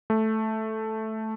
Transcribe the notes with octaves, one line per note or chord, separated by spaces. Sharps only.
A3